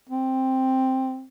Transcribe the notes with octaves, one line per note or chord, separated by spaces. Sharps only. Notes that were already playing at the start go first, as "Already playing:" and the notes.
C4